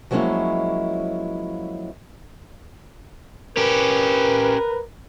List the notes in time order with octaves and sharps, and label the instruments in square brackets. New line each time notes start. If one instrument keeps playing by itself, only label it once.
[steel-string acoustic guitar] F3 F#3 G#3 A#3 C#4 E4
[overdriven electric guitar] C#4 G4 [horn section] A#4 B4